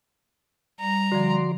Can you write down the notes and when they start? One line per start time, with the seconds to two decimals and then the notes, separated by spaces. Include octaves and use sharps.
0.81 G3 A#5
1.12 D3 F3 F#4 D5 C6